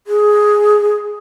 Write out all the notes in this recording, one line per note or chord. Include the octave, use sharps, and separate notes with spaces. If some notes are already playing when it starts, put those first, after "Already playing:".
G#4